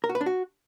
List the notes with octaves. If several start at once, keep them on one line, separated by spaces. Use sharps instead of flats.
A#4
F#4
B4
D4
F#4